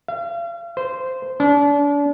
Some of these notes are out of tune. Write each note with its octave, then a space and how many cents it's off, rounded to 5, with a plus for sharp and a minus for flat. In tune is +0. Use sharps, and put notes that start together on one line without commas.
F5 -40
C5 -10
D4 -35